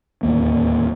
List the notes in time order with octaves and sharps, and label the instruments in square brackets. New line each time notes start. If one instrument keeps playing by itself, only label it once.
[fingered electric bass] D1 G#1 D#2 A#3